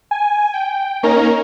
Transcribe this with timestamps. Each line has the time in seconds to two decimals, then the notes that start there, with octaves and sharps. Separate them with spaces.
0.11 G#5
0.54 G5
1.03 A#3 C#4 D#4 A#4 A#5